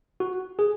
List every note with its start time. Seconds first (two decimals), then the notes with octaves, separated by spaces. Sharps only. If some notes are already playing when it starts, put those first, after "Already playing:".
0.20 F#4
0.59 G#4